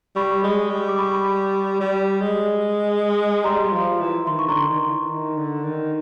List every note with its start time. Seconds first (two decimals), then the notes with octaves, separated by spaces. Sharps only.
0.16 G3 B5 C#6
0.43 G#3
0.70 G3
0.88 D6
0.98 B5 C#6
1.80 G3
2.21 G#3
3.44 G3 A#5 C6
3.72 F3
4.00 E3
4.27 D#3 C6
4.39 C#6
4.48 D3 A#5 C6
4.68 D#3
4.88 E3
5.09 D#3
5.37 D3
5.64 D#3